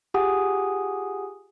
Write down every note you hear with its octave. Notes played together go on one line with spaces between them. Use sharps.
F4 G4 G#4 F#5 G#5 D#6